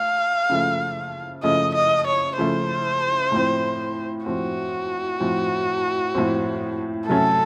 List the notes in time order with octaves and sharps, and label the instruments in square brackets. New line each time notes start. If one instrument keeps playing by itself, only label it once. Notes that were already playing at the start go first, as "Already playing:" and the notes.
Already playing: [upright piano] A3 [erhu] F5
[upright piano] C#3 F3 A3
[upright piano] C#3 F3 A3 [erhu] D#5
[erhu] D#5
C#5
[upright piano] C#3 F3 A3 [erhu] C5
[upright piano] A2 F3 C4
[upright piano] A2 F3 C4 [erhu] F#4
[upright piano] A2 F3 C4
A2 F3 C4
[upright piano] C3 F#3 A3 C#4 [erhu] A4